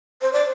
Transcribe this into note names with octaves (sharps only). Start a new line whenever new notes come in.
C5
D5